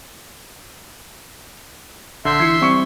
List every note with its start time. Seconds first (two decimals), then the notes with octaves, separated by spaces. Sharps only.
2.25 A#1 D3 E5 C6 G6
2.40 E3 E4 G#6 C7 C#7
2.61 G3 C4 C#6 C#7